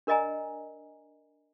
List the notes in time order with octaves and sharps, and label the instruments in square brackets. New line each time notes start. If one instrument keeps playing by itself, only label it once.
[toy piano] D4 A#4 D5 D#5 G#5 A#5